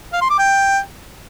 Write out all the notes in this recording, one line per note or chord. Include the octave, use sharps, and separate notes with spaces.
F5
C6
D6
G5